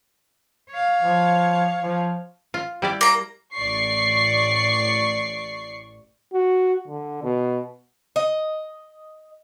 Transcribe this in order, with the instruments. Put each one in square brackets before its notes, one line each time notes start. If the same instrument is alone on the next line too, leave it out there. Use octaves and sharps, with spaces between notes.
[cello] C#5 F5
[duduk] F3
F3
[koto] F4
G3 E4 D5
[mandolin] A#3 A#5
[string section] A1 D5 C#6 C7
[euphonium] F#4
D3
B2
[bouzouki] D#5